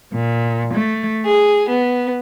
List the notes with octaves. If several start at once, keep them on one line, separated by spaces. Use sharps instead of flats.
A#2
A3
G#4
B3